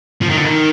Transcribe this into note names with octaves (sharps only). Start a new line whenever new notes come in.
F3
D#3
D3
D#3